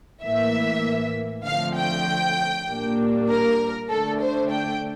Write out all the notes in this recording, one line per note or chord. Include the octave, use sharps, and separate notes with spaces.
A2 E3 A#3 E5
D3 F3 A3 C4 F5
G5
A#2 G3 A#3 D4
A#4
D3 A3 D4 A4
C5
G5